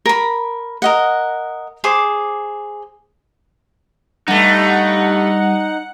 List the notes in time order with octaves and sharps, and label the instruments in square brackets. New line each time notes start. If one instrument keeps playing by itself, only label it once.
[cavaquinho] A#4 B5
A#4 D#5 F#5
G#4 C5 D6
[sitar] G2 A3 [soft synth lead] G3 [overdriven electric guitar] D#4 [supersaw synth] F#5